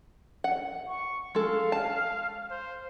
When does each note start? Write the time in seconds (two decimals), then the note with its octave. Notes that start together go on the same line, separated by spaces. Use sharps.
0.44 F#5
0.88 C#6
1.35 G#3 A4 F5
1.72 A5
2.51 C5